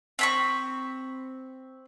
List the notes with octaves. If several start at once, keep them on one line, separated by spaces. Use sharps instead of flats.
C4 B5 C#6